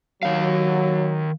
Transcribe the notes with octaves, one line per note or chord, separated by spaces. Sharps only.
D#3 F#3 F5